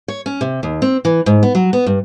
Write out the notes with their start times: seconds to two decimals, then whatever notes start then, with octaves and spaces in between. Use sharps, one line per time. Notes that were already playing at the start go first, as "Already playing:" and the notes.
0.08 C#5
0.26 C#4
0.41 C3
0.63 D#2
0.82 C4
1.05 E3
1.26 G#2
1.43 B3
1.55 F#3
1.73 B3
1.86 G2